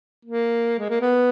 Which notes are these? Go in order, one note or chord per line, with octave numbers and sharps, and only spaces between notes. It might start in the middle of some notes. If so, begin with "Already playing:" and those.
A#3
G#3
A#3
B3